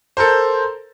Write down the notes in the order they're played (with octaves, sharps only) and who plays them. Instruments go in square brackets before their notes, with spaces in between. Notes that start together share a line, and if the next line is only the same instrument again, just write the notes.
[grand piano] A4 A#4 C5